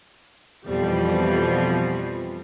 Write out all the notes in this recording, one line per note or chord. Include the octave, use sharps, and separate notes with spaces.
F2 B2 E3 F3 G3